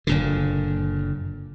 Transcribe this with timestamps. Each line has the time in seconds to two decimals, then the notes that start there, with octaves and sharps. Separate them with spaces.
0.07 F#1 A#2 D3